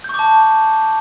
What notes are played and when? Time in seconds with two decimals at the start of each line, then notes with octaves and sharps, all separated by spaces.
0.04 G6
0.09 C#6
0.14 D6
0.19 A5